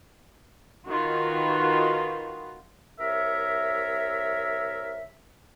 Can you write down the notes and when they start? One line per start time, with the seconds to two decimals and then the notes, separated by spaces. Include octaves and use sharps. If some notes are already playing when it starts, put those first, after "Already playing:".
0.89 D#3 F4 F#4 B4
2.99 C2 A#4 C#5 E5